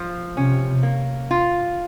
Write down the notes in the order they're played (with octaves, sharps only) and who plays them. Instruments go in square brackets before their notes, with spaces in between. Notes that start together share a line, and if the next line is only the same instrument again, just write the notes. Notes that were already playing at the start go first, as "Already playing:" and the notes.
Already playing: [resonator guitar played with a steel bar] F3
[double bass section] C3 [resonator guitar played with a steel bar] C#4
[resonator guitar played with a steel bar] A#3
F4